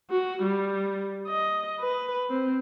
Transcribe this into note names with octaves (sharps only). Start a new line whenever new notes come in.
F#4
G3
D#5
B4
C4